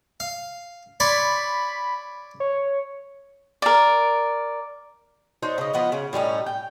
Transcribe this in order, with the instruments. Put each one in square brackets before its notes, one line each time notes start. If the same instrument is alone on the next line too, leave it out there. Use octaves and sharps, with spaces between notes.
[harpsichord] F5
[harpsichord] C#5 D5 C6 [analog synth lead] B5
[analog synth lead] C#5
[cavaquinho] A#4 D5
[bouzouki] D4 D#4 C5 C#5
C#3 D#5
F3 B3 B4 D#5
C#3
A2 G3 C#4 D#4
G5